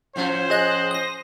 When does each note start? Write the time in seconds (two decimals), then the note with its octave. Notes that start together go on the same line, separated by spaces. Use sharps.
0.16 A2 F3 C#4 C5
0.50 G#4 D#5 F#6
0.91 D#6 A#6